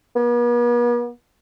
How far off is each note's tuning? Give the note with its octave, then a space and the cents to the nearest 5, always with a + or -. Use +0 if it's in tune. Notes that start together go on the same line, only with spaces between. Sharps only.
B3 -45